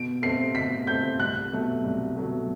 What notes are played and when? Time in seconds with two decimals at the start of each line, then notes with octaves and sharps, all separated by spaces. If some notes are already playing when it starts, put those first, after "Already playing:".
Already playing: B2 D7
0.22 A3 C4 C7
0.55 B2 B6
0.87 A3 C4 G6
1.20 C2 F#6
1.52 B2 F#3 A3
1.84 C2
2.17 B2 F#3 A3